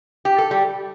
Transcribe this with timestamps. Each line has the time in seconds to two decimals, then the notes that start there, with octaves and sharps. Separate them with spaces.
0.25 G4
0.38 A4
0.51 G3 G4